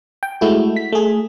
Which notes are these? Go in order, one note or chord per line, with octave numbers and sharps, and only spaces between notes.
G5
G#3 A3 E4 F#4
B6
A3 G#4